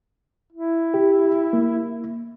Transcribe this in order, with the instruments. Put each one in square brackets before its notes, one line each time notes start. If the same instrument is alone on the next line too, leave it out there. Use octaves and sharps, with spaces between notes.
[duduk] E4
[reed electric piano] G4
A#3